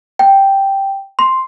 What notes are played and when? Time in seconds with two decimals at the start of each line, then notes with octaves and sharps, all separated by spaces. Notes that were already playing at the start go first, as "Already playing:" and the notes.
0.19 G5
1.19 C6